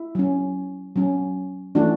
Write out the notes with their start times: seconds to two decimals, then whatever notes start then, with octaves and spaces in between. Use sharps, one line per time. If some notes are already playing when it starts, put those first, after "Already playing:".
Already playing: E4
0.15 F#3 C#4
0.96 F#3 C#4
1.75 E3 A3 C#4 D4 F#4